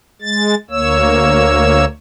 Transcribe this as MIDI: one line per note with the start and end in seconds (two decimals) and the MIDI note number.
0.22 0.55 56
0.22 0.55 93
0.70 1.85 38
0.70 1.85 58
0.70 1.85 73
0.70 1.85 88